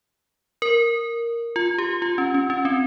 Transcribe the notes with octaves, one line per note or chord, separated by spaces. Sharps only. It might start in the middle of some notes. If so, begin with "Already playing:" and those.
A#4
F4
G4
F4
C#4
C#4
C#4
C4